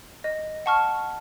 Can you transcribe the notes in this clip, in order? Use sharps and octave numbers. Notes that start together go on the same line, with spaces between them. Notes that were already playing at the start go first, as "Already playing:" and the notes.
D#5
F#5 A5 C#6 F6